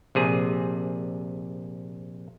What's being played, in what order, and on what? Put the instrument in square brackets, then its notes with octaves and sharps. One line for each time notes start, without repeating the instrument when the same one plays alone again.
[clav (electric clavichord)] A#1 C3 G#4